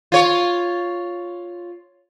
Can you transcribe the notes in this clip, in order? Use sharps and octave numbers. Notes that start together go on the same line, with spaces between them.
F4 C#5